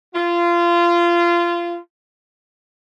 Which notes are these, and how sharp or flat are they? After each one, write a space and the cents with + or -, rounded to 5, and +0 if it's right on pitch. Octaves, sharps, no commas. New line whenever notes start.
F4 -20